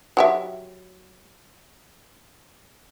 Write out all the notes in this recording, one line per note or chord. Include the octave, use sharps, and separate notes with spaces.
F#3 G4 E5